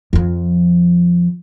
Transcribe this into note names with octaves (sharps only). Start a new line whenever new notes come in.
F2 F3